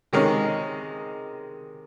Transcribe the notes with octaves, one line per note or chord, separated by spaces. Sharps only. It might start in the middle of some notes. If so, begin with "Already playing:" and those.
C3 D#3 G#3 C#4